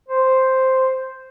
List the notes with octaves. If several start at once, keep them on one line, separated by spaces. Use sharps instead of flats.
C5